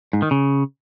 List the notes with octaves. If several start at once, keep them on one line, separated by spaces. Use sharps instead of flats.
G#2
D#3
C#3